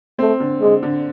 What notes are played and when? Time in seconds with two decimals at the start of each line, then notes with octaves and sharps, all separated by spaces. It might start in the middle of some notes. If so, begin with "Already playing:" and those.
0.19 A3 C4
0.40 D3
0.61 D3 G#3
0.83 D3